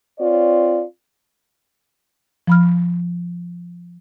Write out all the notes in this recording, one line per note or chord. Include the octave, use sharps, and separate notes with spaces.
C4 F4 C#5 D5
F3 B5 F6